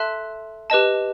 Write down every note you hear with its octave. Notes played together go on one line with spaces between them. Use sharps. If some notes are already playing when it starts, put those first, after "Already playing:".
Already playing: A4 E5 A5 C6 F#6
G4 B4 D#5 A5